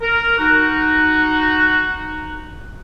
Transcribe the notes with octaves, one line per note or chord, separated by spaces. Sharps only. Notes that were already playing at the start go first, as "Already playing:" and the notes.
A#4
D#4 F#4